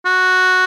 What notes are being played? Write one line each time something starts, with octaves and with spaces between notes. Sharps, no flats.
F#4